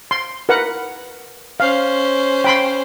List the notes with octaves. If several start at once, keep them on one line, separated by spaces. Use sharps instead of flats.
C6
A#4 B4 F#5
C#4 C5 F5
G5 B5 C6